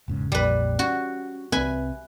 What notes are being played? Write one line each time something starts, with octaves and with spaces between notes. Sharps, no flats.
E1 G#2 C#3
A#1 F2 A#2 G3 B4
C#4 F#4
C2 C4 B4 E5 G#5